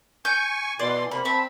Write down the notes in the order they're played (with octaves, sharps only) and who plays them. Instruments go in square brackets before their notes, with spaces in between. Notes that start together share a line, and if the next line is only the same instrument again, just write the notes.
[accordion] G#5 C#6 [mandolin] G6
[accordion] B2 E3 C6 [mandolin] D5
[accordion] C3 A#3 [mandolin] B5
[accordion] C4 [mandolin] E5 A5 B5